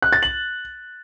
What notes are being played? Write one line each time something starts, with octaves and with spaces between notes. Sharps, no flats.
F#6
A6
F#7